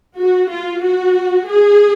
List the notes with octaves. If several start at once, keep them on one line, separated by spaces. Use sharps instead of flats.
F#4
F4
F#4
G#4